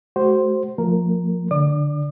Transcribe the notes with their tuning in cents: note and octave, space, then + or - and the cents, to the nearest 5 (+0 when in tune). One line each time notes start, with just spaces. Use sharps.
A3 -40 F#4 +30 C5 +0
F3 +15 A3 +35 A#4 +0
D3 +0 D5 +0 D6 +40